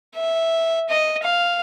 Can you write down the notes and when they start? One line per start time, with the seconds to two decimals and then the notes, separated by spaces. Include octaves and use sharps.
0.15 E5
0.89 D#5
1.23 F5